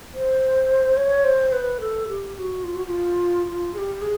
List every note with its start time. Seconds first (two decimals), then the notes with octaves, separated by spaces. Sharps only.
0.14 C5
0.97 C#5
1.25 C5
1.53 B4
1.81 A4
2.08 G4
2.35 G4
2.39 F#4
2.64 F4
2.75 F#4
2.87 F4
3.47 F4
3.74 G#4
3.78 G4
4.02 G#4